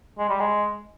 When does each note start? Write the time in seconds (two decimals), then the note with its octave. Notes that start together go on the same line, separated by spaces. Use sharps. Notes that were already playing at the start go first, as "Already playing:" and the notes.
0.18 G#3
0.29 G3
0.40 G#3